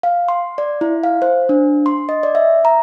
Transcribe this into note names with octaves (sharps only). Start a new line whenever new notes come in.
F5
C6
D5
E4
F5
C5
D4
C6
D#5
D5
E5
A#5